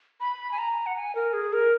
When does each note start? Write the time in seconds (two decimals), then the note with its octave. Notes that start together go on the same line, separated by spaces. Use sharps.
0.20 B5
0.52 G#5
0.58 A#5
0.86 F#5
0.96 G#5
1.15 A#4
1.33 G#4
1.53 A#4